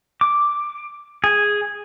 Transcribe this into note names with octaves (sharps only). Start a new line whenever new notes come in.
D6
G#4